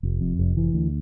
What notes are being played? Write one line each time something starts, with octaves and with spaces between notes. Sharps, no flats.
F1
F2
F1
E3
D2